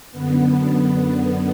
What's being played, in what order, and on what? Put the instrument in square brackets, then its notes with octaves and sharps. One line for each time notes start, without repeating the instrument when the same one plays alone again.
[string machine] F#2 D3 B3